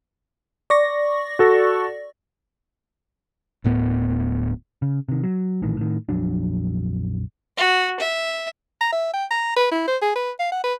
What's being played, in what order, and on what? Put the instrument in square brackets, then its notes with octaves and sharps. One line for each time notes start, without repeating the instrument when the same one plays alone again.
[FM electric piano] D5 C#6 A#6
[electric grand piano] F#4 A4
[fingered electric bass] D1 A2 B3
[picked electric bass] C#3
C3 D#3
F#3
A#1 A2 D#3 E3
A2 D#3
A#1 F2 F#3 D4
[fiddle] F#4
E5
[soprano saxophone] A#5
E5
G5
A#5
B4
E4
C5
G#4
B4
F5
F#5
B4